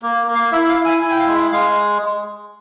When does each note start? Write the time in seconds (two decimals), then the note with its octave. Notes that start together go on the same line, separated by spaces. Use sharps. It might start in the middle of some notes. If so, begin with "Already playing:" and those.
0.02 A#3
0.27 A#3
0.35 F5
0.52 E4 E5
0.69 F5
0.77 E4
0.85 G#5
1.02 E4 G#5
1.11 G5
1.19 F5
1.27 G#3
1.35 E5
1.52 G#3 F5